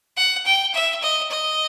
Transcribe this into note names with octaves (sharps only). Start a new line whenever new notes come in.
F#5
G5
E5
D#5
D#5